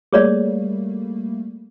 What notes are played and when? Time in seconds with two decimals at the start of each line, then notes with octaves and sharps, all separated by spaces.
0.13 G3 A3 A#3 G#4 C#5 D5